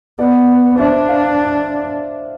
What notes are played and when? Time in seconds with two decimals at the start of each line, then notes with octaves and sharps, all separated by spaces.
0.19 B3 B4 D5
0.79 D4 C5 E5
1.08 D5 F5